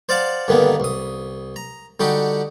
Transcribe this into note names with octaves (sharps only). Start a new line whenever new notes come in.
C5 D5 F5 F#5 A5
G2 D3 D#3 A#3 B3
C2 D#6
A#5
D3 G3 D#4 F#4 G4